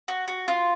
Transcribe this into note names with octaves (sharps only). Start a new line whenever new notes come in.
F#4
F#4
F4